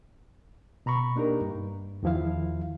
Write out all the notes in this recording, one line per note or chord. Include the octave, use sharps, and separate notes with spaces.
B2 A#5 B5 C#6
A#3 D4 D#4 G4 A#4
G2
E2 D#3 F3 E4 F5